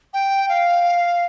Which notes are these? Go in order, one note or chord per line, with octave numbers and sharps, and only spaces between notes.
G5
F5